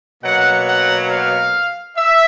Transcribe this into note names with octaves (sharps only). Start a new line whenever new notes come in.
B2 F#3 A#3 F#5
F#5
F5
E5